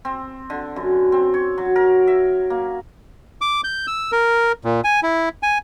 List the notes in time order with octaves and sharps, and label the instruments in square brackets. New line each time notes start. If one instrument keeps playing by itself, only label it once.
[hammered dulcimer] C4
D3
F#2
C4
C#5
F#3
A#4
E5
A#3
[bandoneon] D6
G6
E6
A#4
A#2
G#5
E4
G#5